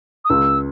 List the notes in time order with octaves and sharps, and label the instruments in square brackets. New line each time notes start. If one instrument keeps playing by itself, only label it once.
[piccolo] D#6
[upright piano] C#2 [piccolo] E6